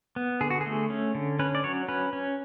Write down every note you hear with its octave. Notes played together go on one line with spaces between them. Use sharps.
B3
D3 G#4
F#4
G#4
A3
C#4
D3
C#4 B4
D5
F#3 C#5
C#4 B4
C#4